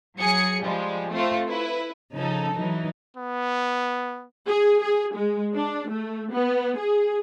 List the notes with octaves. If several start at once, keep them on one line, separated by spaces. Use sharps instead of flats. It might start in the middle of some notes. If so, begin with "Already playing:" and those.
F#3 G#4 C#7
F3 G3 G#3
A3 C4 F4
E4 B4
C#3 F3 D#4 A4
E3 F#3 D#4
B3
G#4
G#4
G#3
D4
A3
B3
G#4